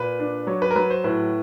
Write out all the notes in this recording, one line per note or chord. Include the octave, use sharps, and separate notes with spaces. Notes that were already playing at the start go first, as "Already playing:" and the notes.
Already playing: A#2 B4
D4
F#3 C#5
B4
A#4
F#3 B4
C5
A2 B4